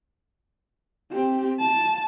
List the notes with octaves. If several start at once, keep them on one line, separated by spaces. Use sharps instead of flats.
C4 G4
A5